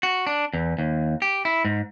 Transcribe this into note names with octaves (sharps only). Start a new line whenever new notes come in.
F#4
D4
E2
D#2
G4
E4
G#2